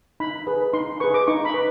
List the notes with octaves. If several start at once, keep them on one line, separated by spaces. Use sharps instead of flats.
D#4 B5
G#4 B4
D#4 C6
G#4 B4 C#6
D6
D#4 C#6
B5
B4